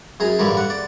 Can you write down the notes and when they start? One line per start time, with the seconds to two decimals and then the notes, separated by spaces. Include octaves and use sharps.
0.20 F#2 G#4 A#5
0.39 A1 G2 D3 E3 G3 A#4
0.57 F#5
0.70 D5